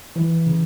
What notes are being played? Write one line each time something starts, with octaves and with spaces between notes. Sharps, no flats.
E3
C#3